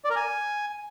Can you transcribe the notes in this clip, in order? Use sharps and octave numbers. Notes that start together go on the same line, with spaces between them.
D5
A#4
G#5